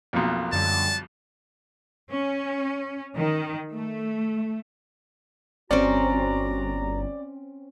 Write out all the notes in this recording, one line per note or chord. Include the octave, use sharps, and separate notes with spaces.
B1 F2 A#3
F#2 D3 G3 A5
C#4
D#3
A3
G1 C4 C#4 F#4 D5 A#5